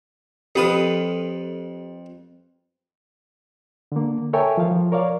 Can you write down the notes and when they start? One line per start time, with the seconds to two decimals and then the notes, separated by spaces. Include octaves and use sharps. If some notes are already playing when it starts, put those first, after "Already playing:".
0.55 F2 G4 A4 B4 D#6
3.92 D3 A#3
4.33 A4 A#4 C#5 E5 G5 G#5
4.57 F3 F5
4.71 F3
4.92 A#4 C#5 D5 F5